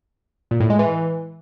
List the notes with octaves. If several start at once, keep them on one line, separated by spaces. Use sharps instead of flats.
A#2
A2
G#3
E3